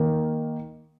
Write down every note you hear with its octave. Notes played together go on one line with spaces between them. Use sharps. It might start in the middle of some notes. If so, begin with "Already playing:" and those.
Already playing: D#3 A#3 D#4